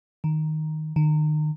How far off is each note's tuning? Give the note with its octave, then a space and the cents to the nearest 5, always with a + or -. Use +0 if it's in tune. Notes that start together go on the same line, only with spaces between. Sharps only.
D#3 +0
D#3 -30